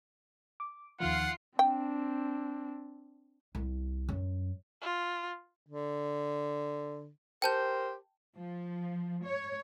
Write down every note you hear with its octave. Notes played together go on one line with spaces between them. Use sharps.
D6
D#2 D#3 F3 F4 F#5 C7
C4 D4 G5
C2
F#2
F4
D3
G4 A#4 C5 G5 A5 G6
F3
C#5